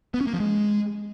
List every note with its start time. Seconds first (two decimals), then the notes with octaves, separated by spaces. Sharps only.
0.14 B3
0.21 C#4
0.27 A#3
0.33 F3
0.40 G#3